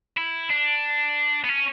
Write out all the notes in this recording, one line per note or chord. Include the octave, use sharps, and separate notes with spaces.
E4
D4
B3
C#4